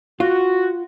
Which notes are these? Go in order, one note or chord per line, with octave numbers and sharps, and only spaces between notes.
F4 F#4